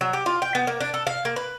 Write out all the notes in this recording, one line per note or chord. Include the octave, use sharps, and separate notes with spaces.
F#3
G4
F4
G5
B3
A#3
D4
A4
F5
A#3
B4